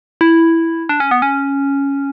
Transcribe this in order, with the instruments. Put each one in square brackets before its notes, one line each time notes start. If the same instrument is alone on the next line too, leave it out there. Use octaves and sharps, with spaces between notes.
[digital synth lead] E4
D4
C#4
B3
C#4